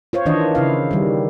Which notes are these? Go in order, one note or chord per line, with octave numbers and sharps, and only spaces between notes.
F4 C5 C#5
D#3 E3 D4 C#5 D#5
C#3 E4 F5
D#3 G3